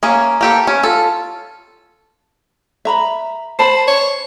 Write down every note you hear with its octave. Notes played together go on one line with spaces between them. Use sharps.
A#3 C#4 G#4
A#3 G4 A4
C#4
F4 A4
E5 A#5 B5
C5 A5 B5
C#5